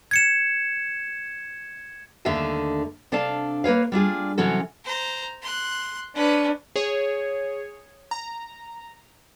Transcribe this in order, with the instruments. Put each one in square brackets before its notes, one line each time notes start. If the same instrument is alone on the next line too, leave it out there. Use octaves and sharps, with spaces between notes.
[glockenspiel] G#6 C#7 E7
[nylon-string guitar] D#2 D3 A3 E5 F5 A5
C3 D4 A4 D5 F5 A5
A#3 B4 C#5 F5
G3 D4 F4 G#4
C3 E3 F#3 C#4 A4
[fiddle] C5 A#5
C6 F#6
[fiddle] C#4 B4 [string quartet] D4
[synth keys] G#4 C#5
A#5